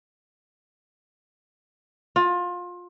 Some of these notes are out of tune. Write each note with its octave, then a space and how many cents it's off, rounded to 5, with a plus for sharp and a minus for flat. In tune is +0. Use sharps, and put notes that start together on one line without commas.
F4 +25